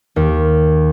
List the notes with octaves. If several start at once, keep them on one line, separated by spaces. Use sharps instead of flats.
D#2